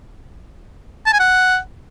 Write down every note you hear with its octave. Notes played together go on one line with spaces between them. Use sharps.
A5
G#5
F#5